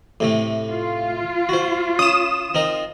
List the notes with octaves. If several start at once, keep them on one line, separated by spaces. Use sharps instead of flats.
A2 C3 A3
F4
F#4 C5
C#4 D#6 E7
C4 D#4 A#4